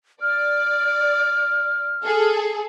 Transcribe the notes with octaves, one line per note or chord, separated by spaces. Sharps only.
D5 F6
G#4 A4